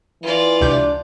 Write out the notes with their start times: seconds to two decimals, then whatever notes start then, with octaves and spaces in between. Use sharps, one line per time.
0.23 E3 F4 D5
0.61 C#2 C3 D4 G6